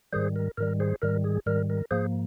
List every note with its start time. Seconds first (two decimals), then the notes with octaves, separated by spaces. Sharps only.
0.13 G#2 D#3 G3 G#4 C5
0.36 A#4
0.57 G#2 D#3 G3 A#4
0.80 G#4 C5
1.02 G#2 D#3 G3 A#4
1.24 G#4
1.46 G#2 D#3 G3 A#4
1.70 A#4
1.91 G#2 F3 A#3 G#4 C5